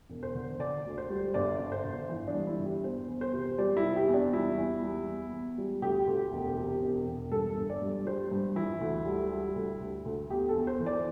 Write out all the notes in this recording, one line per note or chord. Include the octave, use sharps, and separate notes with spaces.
E1
C5
D3
D3 D5
D2
C5
G3
G1 D5
G1
C5
G1
E3
D4
G2
E4
G1
G4
E2 C5
E2
C5
C3
G3 D5
E4
C3
G4
E2
D4
G3 E4
E2
G3
E2
E2
G3
D2 G4
D2
E1
C3
E1
E1
G2 A4
G1
D5
G2
G3 C5
G2
E3 E4
D2
G3
G3
D2
D2
D2
E2 G4
A4
E2
C5
E3
D5